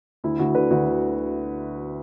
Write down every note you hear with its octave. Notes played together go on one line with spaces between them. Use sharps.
D2 E4
D2 F#4
D3 B4
D2 F#4
D3